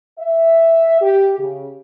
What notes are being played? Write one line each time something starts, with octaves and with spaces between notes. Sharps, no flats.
E5
G4
C#3